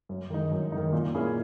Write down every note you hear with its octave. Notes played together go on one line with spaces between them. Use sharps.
F#2
D#3 G#3 D#4
F#2
D#3 G#3 D#4
A#2
A#3 C#4 E4 G#4